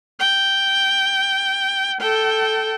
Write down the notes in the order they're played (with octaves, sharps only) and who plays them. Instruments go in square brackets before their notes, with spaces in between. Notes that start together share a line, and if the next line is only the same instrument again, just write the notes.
[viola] G5
A4 G5